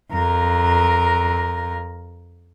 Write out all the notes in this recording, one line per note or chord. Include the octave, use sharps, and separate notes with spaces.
F2 A#4